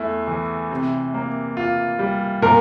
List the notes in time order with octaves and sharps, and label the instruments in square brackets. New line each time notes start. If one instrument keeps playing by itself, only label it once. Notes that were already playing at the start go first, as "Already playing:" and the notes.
Already playing: [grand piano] E2 A3 E4
E3
C3
A#3
F4
G3
[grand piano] A#2 [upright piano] A#4